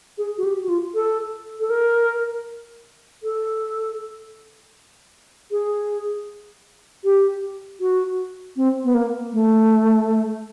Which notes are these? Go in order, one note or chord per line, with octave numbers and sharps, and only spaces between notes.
G#4
F#4
G4
F#4
F4
A4
A4
A#4
A4
G#4
G4
F#4
C4
B3
A#3
A3